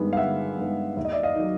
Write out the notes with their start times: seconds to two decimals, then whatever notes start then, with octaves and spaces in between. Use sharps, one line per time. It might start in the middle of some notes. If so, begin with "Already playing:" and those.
Already playing: G2 D#3 G#3 B3
0.13 F5
0.17 G1 E5 F#5
0.57 G2 D#3 G#3 B3
0.97 D#2 E5
1.05 D#5
1.12 D5 E5
1.23 D#5 F5
1.36 D#3 F#3